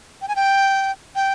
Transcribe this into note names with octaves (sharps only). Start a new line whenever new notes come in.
G5
G#5
G5
G5